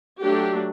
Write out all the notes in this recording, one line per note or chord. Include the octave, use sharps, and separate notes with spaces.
F#3 A3 D4 G4